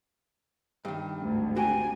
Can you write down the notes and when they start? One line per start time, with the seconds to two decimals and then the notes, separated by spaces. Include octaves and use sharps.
0.85 G2 D#3
1.21 G#1 D2
1.56 F#4 G4 G#5